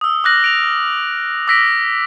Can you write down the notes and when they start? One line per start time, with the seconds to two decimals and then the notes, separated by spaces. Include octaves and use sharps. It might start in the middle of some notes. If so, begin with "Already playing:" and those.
0.01 D#6 E6
0.24 D6 F6 F#6 A#6 F#7
0.44 D7 F7
1.48 D6 E6 A#6 B6 D7 F#7